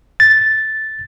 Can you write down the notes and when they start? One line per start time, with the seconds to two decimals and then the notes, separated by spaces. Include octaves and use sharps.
0.20 A6